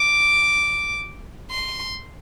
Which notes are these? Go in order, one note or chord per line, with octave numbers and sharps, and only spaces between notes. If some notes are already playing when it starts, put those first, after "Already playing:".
Already playing: D6
C6